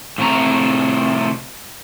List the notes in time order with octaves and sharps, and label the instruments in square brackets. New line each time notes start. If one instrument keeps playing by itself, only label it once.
[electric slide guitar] A2 C3 A3 A#4 A#5